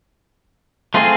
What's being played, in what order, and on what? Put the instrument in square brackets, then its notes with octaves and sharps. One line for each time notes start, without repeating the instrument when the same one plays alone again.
[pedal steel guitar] A3 C4 F4 G#4